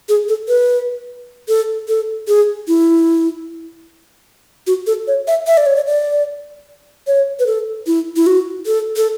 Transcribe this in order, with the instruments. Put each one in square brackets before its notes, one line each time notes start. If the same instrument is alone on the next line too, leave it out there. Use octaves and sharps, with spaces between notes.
[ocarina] G#4
A4
B4
A4
A4
G#4
E4
F#4
A4
C#5
E5
E5
D5
C#5
D5
D5
C#5
B4
A4
E4
E4
F#4
A4
A4